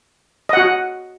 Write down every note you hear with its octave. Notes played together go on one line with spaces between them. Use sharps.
F#4 D#5 F#5